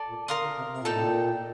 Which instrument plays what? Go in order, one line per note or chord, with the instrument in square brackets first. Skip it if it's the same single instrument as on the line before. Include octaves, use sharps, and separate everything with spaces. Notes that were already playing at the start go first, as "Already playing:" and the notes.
Already playing: [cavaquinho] A4 D5 A5
[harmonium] A#2
[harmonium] D3 [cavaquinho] A#4 F5 C6 D#6
[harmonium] D3
C3
C3
A#2
[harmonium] A2 [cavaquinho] D#4 A4 D5 G5
[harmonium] A#2